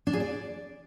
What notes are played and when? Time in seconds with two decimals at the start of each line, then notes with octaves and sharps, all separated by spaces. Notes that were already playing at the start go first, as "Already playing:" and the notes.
0.07 D4
0.13 G#4
0.20 D5